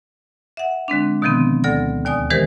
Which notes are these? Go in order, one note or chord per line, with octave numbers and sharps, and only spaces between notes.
E5 F#5
D3 G#3 C4 D4
B2 D3 D#3 F3 B3 C4
D2 A4 D5 A#6
D#2 D5 G#5 D#6
D#3 E3 G#3 G4 A#4 C5